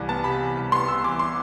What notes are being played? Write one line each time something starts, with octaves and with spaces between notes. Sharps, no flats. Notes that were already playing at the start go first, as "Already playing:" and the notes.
Already playing: C2 E3
B3 A5
C3 B5
E3
C2
B3 C6
C3 E6
E3 D6
C6